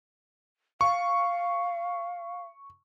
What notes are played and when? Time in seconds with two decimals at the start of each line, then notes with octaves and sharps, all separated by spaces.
0.81 F5 C#6